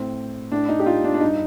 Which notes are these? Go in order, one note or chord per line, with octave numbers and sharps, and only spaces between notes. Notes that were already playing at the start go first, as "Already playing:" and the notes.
Already playing: A2 C4
A2 D4
D#4
G4
F4
D4
D4
G2 D#4